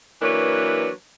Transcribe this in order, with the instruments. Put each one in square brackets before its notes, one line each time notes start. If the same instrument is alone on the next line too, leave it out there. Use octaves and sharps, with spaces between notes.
[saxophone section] E3 F#3 A#3 D4 B4 C#5